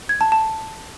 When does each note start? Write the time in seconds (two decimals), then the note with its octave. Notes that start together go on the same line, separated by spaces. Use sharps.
0.09 G#6
0.21 A5
0.32 A5